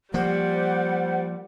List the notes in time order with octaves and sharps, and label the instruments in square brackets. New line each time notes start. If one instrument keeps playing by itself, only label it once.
[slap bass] F3 A#3 [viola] G3 [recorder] C5 [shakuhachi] F#5